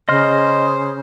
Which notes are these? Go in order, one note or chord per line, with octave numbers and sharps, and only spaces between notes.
C#3 C5 D#5 C6 F6